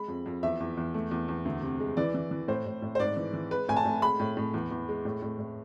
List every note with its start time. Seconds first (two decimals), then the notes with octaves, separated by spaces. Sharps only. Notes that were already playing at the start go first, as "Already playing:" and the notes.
Already playing: G#3 B5
0.08 F2
0.26 F2
0.43 E2 E5
0.60 E2
0.77 E2
0.94 A3
1.11 E2
1.28 E2
1.45 D2
1.62 C3
1.80 G#3
1.97 E3 D5
2.14 E3
2.31 E3
2.48 A2 C5
2.66 A2
2.82 A2
2.95 C5
3.00 G#2 D5
3.17 E3
3.33 E3
3.51 G#3 B4
3.68 A2 G#5
3.77 A5
3.85 A2
4.02 G#3 B5
4.20 A2
4.37 A2
4.54 E2
4.71 E2
4.88 G#3
5.05 A2
5.22 A2
5.39 A2